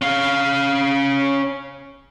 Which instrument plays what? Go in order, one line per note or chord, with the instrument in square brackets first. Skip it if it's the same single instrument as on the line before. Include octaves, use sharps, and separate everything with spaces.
[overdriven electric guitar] C#4 F5